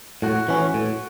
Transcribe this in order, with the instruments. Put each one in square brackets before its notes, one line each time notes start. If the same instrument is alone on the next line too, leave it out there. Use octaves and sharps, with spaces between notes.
[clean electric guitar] A2 [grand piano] F#4
[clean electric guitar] E3 C#4
A2